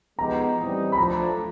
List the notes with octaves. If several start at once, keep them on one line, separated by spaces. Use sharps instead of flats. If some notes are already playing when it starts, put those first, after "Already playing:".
F3 G#3 B3 D#4 G4 A#5
A2 E3 G3 C4 D#4
B5
F3 A3 D4 A#5